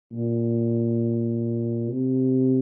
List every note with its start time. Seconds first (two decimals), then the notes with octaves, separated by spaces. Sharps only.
0.12 A#2
1.88 C3